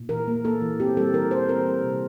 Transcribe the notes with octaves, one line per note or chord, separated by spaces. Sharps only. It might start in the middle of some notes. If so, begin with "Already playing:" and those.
Already playing: A#2
E3 A#4
A#3
A#3 A4
E3
C4 G4
G3 A4
E3 A#4
E3 C5
C4 A#4
G3
C3